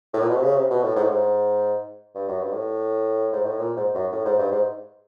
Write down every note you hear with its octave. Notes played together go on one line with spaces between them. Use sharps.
A2
A#2
B2
C3
C#3
C3
B2
A2
G#2
A2
G#2
G2
F#2
G2
A2
G#2
A2
A#2
G#2
F#2
A2
G#2
G2
G#2